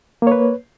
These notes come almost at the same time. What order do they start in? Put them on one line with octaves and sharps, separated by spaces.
A#3 C#5 B4